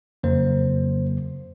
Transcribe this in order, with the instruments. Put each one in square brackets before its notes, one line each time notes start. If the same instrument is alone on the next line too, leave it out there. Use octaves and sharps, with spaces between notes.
[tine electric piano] F2 C#3 F#3 A#3 C5